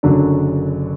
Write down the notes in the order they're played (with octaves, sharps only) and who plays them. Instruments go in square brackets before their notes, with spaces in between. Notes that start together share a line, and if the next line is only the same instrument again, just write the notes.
[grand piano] F#1 F#2 D3 F#3 D4